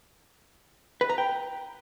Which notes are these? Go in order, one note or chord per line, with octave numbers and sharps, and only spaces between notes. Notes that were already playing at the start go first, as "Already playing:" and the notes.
B4
A#5
G5